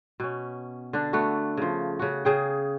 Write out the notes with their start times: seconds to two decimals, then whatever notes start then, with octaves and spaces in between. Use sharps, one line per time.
0.20 B2 C#4
0.93 D3 D4
1.13 A3 B3 F#4
1.57 C#3 F3
1.99 C#3 F#4
2.25 C#3 G#4 G5